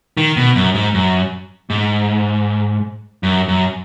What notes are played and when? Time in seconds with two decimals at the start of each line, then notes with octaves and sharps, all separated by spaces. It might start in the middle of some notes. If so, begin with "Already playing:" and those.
0.17 D#3
0.37 B2
0.55 F#2
0.74 G#2
0.94 F#2
1.70 G#2
3.23 F#2
3.48 F#2